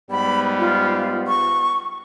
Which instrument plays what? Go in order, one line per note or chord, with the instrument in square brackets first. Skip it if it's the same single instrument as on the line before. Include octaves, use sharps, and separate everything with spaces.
[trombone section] G#2 G3 B3 [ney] B5
[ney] F4
C#6